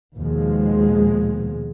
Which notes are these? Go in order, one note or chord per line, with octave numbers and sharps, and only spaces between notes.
D#2 B2 F3 G#3